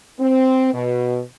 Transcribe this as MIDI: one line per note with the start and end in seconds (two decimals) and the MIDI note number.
0.20 0.72 60
0.73 1.20 47